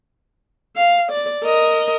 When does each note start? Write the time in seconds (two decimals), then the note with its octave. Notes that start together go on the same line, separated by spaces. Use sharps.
0.76 F5
1.11 D5
1.44 A#4 D#5